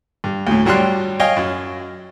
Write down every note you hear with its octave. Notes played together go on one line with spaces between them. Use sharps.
G2
D2 A2
G2 F#3 G3 G5 C6 F#6
C#5 D#5 F5 G5 G#5
F#2